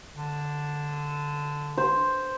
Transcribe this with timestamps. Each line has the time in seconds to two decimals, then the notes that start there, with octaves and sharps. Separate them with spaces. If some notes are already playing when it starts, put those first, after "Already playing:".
0.14 D3
1.78 C5